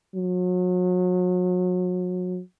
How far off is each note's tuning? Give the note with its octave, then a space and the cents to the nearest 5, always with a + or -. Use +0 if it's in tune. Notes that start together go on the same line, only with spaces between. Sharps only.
F#3 -35